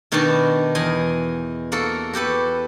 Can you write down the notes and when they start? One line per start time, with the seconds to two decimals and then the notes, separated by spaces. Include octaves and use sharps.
0.12 B2 D#3 D4 F#4 B4 A5
0.75 E2 D#5 G#5
1.72 A#3 F#4 A4
2.13 F#4 G4 A4 B4